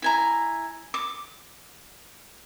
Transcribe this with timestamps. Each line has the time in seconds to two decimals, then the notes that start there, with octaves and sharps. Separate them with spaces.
0.02 E4 G#5 A#5
0.94 D6